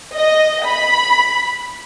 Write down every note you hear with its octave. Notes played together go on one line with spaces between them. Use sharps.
D#5
B5